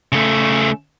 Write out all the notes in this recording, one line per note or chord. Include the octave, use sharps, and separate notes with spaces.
C#3 A3